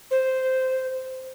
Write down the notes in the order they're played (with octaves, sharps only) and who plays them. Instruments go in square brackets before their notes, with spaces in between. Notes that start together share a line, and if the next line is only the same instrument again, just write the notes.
[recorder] C5